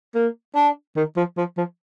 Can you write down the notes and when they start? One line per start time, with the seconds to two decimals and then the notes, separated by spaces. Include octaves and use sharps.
0.15 A#3
0.55 D4
0.96 D#3
1.16 F3
1.37 F3
1.57 F3